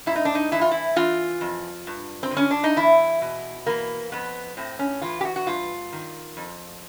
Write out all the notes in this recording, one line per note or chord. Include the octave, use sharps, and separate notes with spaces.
G#2 E4
D#4
D4
D#4
E3 E4
F4
E4
E3 F4
F2
G2
C4
D3
C#4
D4
D#4
E2 E4
B2
E3 A#3
F2 B3
A2 C4
C#4
E3 F4
G4
F#4
F#4
G2 F4
D#3
F2